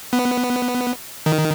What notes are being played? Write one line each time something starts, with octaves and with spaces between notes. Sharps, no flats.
B3
D#3